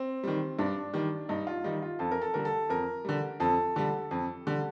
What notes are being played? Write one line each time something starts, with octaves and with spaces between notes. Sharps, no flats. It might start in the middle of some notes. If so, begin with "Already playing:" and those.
Already playing: C4
D#3 G3
G2 D4
D#3 G3
G2 D#4
F4
D#3 G3 D#4
F4
F2 A4
A#4
A4
D3 G3 A#4
A4
F2 A#4
D3 G3
F2 A4
D3 G3
F2
D3 G3